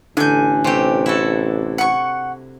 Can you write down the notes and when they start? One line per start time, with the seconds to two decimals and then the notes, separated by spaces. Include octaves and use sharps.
0.17 A1 D3 G#5 G6
0.64 C3 A3 G4
1.06 E4 F#4 A4
1.78 F#5 C#6